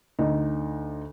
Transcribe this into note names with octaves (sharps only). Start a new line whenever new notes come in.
D2 D#4